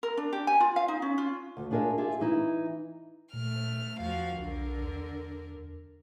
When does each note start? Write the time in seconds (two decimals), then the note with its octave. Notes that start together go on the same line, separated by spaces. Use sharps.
0.03 A#4
0.17 D4
0.33 G4
0.47 G#5
0.60 F4
0.76 F5
0.88 D#4
1.02 C#4
1.18 F4
1.57 D2
1.71 D4 F4 G#4 A#4 D#5 E5
1.98 F4 G4 G#4 E5
2.20 E3 D#4 E4
3.33 A#2 A3 F6
4.00 E2 F3 F#4 F5
4.38 B1 D3 A#4
4.81 E2